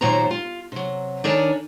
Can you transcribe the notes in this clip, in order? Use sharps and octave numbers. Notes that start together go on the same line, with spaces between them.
D#2 A#2 F#3 C5 A#5
F4
C3 F#3
D#3 D4 A#4 C#5 G#5